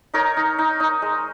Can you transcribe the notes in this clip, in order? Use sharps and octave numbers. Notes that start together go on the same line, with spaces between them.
D#4 A#4 C#5
D#4
D#4
D#4
G#3